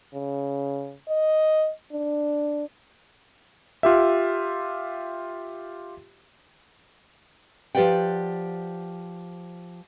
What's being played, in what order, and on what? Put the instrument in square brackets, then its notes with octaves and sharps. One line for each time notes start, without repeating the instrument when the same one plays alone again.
[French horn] C#3
D#5
D4
[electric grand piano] F4 G4 E5
[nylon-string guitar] F3 G4 B4 D5 F#5 G5